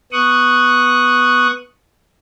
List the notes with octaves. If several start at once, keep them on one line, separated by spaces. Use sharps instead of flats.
B3 C#6 D#6 F#6